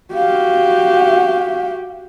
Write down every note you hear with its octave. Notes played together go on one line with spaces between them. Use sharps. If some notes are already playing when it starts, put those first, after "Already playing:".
F#4 G4 F5